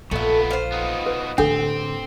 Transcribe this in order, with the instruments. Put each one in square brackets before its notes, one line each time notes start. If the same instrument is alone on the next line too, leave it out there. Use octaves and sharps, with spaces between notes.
[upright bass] A#1 [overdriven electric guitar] A#2 B3 [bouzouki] A3 E5
[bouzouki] F4 C5
[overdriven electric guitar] B3 D#4
[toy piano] B4
[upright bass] A2 D3 [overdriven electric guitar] C4 [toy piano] D4 A4 [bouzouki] G4